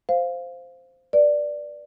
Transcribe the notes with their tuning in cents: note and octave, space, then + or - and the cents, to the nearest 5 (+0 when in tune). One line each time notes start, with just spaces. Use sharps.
C5 -5 F5 +0
B4 -20 D5 +0